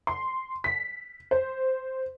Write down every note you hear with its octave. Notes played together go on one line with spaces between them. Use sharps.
C6
B6
C5